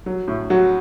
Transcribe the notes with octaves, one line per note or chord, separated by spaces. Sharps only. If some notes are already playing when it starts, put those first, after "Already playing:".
F#3
A2
F#3 F#4